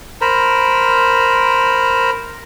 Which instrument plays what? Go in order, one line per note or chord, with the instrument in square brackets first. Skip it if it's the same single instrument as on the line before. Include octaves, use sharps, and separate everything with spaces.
[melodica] A#4 C5 A#5 B5